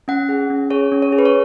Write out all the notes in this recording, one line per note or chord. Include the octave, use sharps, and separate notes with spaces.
C#4 F#5
G#4
C#4
G#4 C#5
C#4
C#5
G#4
B4
C#5